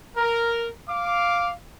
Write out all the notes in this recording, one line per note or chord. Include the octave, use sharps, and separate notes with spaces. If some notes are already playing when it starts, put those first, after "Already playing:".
A#4
F5 D6